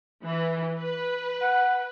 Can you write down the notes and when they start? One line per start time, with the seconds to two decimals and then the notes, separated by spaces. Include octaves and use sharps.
0.24 E3
0.78 B4
1.42 F#5